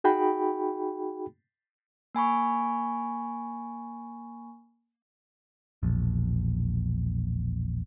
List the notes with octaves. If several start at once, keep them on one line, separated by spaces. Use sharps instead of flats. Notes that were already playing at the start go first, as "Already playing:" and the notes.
D#4 F#4 G#4 G5 B5
A#3 G#5 B5 C#6
E1 A#1